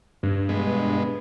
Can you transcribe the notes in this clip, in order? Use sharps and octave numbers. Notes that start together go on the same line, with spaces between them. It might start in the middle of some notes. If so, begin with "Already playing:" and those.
G2
B2 G#3 B3